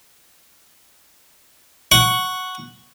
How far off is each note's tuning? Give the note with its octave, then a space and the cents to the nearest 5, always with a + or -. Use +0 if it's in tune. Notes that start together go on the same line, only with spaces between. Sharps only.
F#5 +0 C#6 +0